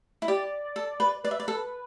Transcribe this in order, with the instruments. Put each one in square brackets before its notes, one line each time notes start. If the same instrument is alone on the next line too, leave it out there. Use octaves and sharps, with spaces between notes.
[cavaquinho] E4
[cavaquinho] G4 [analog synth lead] D5
[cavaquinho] A4
B4
[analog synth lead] B4 [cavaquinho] D5
[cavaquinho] E5
D5
A4